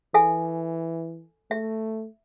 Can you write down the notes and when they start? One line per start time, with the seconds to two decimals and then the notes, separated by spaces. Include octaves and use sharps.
0.14 E3 A4 E5 G#5
1.51 A3 E5